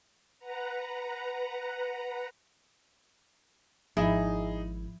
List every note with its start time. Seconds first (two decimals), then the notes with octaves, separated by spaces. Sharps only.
0.39 B4 F#5 A#5
3.97 G#1 F3 D#4 E4 G#4